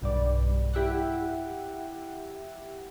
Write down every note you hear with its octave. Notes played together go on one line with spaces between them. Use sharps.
B1 G2 D5
E4 G4 E5 F#5